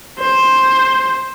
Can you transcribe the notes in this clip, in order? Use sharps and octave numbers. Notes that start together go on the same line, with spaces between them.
C5